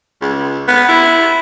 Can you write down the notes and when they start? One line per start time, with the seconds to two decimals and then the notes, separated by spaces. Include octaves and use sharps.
0.21 C#2
0.68 B3
0.89 E4